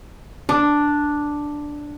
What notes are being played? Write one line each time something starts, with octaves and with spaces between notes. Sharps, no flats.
D4